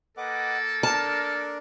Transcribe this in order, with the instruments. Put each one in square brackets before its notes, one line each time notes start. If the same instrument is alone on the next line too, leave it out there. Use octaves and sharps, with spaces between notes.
[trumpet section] A#3 A4 [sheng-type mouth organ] B4 D#5 D6 [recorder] F#5
[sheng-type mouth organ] D4 A#4 D5 [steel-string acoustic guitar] A5 [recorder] F6